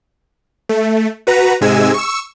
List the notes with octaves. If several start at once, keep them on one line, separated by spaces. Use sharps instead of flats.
A3
F#4 B4 A#5
G#2 C3 G#3 G#5 E6
C#6 E6